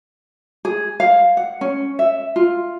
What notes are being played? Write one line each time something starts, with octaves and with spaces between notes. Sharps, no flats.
G#4
F5
F#5
C#4
E5
F4